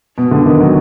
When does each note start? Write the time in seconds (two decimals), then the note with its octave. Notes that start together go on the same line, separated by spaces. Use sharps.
0.18 B2
0.31 D3
0.46 D#3
0.60 F#3